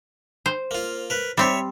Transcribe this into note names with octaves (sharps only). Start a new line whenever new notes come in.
C5
A#3 F4
A#4 B4
G3 C4 C#5 E5